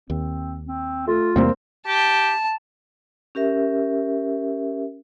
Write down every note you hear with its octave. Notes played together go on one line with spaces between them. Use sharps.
D#2 C4
C4
A3 F4
E2 C3 G3 A#3 C4
G4 A5
C#4 G4 A#4 E5